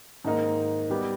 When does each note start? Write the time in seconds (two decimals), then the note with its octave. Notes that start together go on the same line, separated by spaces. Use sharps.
0.24 G#2 D#3 A#3 D#4 A#4
0.90 G3 B3 G4